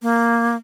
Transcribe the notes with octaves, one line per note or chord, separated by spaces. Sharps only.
A#3